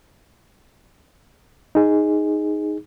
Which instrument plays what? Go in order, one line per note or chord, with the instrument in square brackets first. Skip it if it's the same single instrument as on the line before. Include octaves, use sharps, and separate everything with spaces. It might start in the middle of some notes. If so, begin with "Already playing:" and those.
[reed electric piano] D#4 G#4